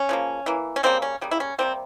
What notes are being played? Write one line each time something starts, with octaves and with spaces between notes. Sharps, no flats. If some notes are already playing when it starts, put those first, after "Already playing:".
Already playing: C#4
C#3 F3 A#3
E3 A#3
C#4
C#3 G3 A#3 C4
C#4
C#3 G3 A#3
E4
C#4
C3 E3 G3 A#3 C4